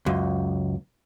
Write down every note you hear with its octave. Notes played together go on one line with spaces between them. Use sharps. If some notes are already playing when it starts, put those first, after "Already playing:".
C#2 F#2